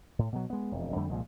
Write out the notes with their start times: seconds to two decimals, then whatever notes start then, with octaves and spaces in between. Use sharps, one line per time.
0.19 A2
0.32 B2 F#3
0.50 G#3 B3
0.72 E1 F2
0.96 F2 D3 G3 A3
1.10 C2 A#2 F3 G#3